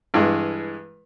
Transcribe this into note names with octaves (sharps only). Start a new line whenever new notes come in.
G2 E3 G#3